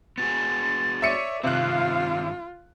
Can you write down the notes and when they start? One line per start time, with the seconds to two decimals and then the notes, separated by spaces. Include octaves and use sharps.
0.18 B3 F#4 G#4 A6
1.02 C#5 D5 E5 C#7 D#7
1.44 G2 C3 D#3 C4 F4 F5 F#6